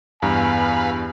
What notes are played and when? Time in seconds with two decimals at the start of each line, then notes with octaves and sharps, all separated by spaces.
0.22 E2 G2 B4 F5 G#5 A#5